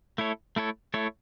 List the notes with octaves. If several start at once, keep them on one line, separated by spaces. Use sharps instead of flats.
A3 E4 A4 C#5
A3 E4 A4 C#5
A3 E4 A4 C#5